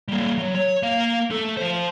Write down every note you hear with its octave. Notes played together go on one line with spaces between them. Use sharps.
G3 A#3
F#3
C#5
A#3 F5
A3 A4
F3 C5